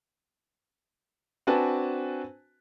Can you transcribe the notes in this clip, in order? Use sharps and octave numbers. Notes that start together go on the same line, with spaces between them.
C4 D4 F#4 B4 G#5 A5